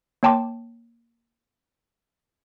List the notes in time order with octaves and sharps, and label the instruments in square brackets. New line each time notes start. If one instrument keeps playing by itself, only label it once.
[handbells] A#3 C#5 G5 A5 C6 D6